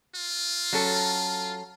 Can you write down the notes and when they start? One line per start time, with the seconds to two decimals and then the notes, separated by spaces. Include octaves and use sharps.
0.15 F4
0.73 F#3 C#4 A4